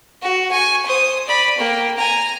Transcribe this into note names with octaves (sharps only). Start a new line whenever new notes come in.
F#4
G#5 C#6
C5 D#6
D5 B5
A#3 G5
G#5 A#5